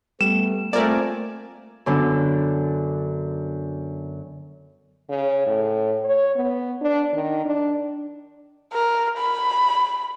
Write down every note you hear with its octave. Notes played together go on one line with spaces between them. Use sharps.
G3 A3 B3 E7
A3 A#3 C4 F4 A#4 D5 G#5
F#2 D3 B3 D4
C#3
A2
C#5
B3
D4
D#3
D4
A#4
B5